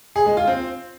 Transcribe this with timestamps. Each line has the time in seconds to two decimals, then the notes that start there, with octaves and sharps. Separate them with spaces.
0.16 G#4
0.26 G#3
0.37 F4
0.48 C4